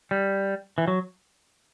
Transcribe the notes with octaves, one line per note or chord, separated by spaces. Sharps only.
G3
E3
F#3